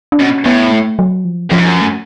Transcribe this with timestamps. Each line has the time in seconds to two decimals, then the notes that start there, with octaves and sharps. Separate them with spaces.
0.12 D4
0.20 B2 C#4
0.46 A2 B3
0.72 A3
0.99 F#3
1.25 F3
1.51 F#2 F3
1.59 G#2
1.66 F#2
1.81 A3